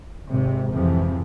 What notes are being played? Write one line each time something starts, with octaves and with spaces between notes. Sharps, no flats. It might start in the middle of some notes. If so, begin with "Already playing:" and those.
G#1 G#2 C3
F2 G#2 C3 E3 F3